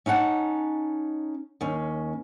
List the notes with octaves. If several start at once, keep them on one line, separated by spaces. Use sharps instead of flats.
C#4 D#4 E4 F#5 A5
D#2 C#4